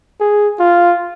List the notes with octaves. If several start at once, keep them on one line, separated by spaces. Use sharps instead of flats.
G#4
F4